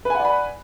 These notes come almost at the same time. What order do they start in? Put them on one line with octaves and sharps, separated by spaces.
B4 G#5 F#5 D5 B5